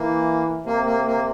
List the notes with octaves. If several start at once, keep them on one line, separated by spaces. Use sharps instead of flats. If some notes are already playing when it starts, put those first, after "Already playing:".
Already playing: E3 A#3
C3 A#3
A#3
A#3